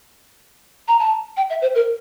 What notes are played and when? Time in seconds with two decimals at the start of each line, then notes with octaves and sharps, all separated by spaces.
0.88 A#5
0.99 A5
1.37 G5
1.50 E5
1.62 C5
1.75 A#4